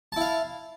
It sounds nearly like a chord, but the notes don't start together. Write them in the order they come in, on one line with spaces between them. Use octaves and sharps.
A5 E4 F5